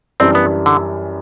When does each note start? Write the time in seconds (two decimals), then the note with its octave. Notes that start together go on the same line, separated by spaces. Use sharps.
0.20 F#2 E3 G3 C4 D4
0.35 B3
0.66 D3